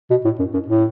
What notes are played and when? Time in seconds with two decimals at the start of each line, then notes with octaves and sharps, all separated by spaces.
0.10 B2
0.25 A2
0.39 F#2
0.53 F#2
0.68 A2